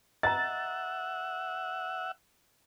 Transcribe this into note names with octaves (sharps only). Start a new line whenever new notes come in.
D#5 E5 F#5 A#5 A6